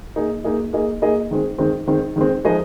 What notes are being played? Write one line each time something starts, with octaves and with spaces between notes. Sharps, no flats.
A#3 D#4 G#4 D#5
A#3 D#4 G#4 D#5
A#3 D#4 G#4 D#5
A#3 D#4 G#4 D#5
D#3 G#3 C4
D#3 G#3 C4
D#3 G#3 C4
D#3 G#3 C4
F3 G#3 D#4 G#4 D#5